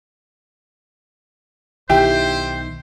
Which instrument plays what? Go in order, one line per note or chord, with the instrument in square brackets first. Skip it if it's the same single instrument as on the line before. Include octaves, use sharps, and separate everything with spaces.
[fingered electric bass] B1 D#3 [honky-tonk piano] E4 G4 G5 [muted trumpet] C5